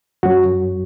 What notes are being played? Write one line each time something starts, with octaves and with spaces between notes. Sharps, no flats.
F#2 F#3 F#4